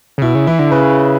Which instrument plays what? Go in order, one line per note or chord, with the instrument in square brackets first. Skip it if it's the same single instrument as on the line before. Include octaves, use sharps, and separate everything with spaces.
[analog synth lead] C#3
[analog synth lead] B2 [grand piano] E4
[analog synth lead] C#3
[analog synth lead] E3 [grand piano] E4
[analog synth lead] D3
[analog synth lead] C#3 [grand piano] B4